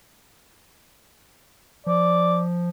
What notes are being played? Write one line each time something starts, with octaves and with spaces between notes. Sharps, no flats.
F3 D5